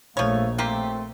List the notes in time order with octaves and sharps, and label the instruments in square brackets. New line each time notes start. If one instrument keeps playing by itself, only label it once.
[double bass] A#1 [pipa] F3 C#5 [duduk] A3 [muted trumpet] F5
[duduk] A3 [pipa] A#3 F4 G4 [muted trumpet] C4